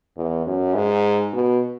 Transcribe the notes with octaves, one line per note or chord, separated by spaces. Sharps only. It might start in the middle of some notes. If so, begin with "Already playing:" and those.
E2
F#2
G#2
B2